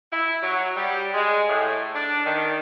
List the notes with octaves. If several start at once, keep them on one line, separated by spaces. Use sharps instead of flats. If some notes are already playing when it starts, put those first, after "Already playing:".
E4
F#3
G3
G#3
A2
D4
D#3